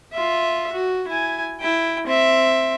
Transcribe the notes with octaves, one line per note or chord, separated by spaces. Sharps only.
F4 E5
F#4
E4 G#5
E4 G5
C4 E5